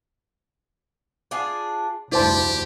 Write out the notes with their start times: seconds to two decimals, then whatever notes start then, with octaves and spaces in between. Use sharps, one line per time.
1.31 D4 F4 G#4
2.12 F1 D2 G2 E4 G4 C5 D5 A5